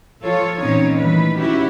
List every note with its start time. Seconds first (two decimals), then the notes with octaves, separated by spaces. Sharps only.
0.22 F3 F4 A4 C#5
0.61 A#2 E3 C4 C#4 D#4 C#5
0.98 D#3 E3 G3 A3 B4
1.39 C#4 E4 F#4 G4